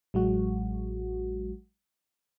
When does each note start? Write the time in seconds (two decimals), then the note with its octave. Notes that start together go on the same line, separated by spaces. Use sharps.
0.14 A1 F#3 G#3 F#4